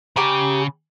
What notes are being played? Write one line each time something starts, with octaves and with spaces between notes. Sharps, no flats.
C#3 G4 G#5 A#5